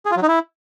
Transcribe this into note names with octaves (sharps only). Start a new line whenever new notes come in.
G#4
F4
F#3
D#4
E4